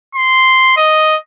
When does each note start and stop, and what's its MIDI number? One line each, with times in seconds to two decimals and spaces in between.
0.15 0.75 84
0.77 1.17 75